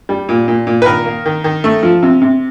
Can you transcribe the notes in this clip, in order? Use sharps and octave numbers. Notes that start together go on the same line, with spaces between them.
G3
A#2
A#2
A#2
B4
D#3 A#4
A#3
D#3
D#3
A3
F3
C3
C3